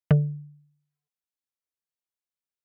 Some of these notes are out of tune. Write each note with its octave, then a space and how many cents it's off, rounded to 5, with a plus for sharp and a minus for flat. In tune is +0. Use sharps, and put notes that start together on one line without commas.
D3 +0